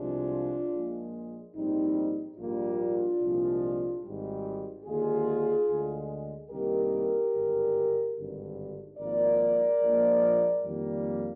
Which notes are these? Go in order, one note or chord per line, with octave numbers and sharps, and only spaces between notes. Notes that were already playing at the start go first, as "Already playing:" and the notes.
Already playing: C2 C3 F3 G#3 D4 F4
A#1 A#2 G#3
A#1 G#2 G3 C4 D#4
A#1 G#2 G3 A#3 D4 F4
C2 A#2 F3 G#3
G#1 G#2 G3
D#2 D3 G#3 F4 G#4
D2 D3 G#3
C2 C3 D#3 G3 A#3 G4 A#4
G#1 G2 D3 G#3
G#1 G2 D3
G#1 G#2 F3 A#3 A#4 D5
A#1 A#2 F3 G#3
F2 D#3 G3 A#3